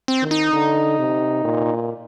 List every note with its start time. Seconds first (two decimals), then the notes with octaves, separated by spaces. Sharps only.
0.08 C4
0.22 D#3
0.31 D#4
0.53 D3
0.98 C3
1.44 A#2